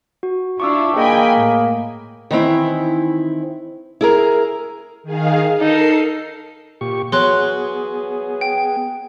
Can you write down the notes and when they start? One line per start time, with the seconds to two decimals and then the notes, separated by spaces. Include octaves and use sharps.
0.23 F#4
0.60 D4 E4 F4 C#6 D6 E6
0.96 A#3 G#4 D#5 G5 G#5 B5
1.38 A2
2.31 D#3 E3 C4 E4
4.01 E4 G#4 A#4
5.03 D#3 G#4 F5
5.60 D#4 A4 A#4 C7
6.81 A#2 G4 C#6
7.12 F#3 B3 G#4 C6 F#6
8.41 G5